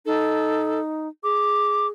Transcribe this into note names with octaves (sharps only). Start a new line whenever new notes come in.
D#4 A4
G#4 D6